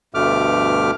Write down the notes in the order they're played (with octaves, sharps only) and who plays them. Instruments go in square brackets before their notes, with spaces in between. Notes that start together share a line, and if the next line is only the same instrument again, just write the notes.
[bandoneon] D2 G2 B2 A3 D6 F6